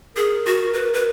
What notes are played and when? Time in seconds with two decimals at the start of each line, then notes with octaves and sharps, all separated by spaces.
0.15 G#4 A#4
0.46 F#4
0.73 B4
0.94 B4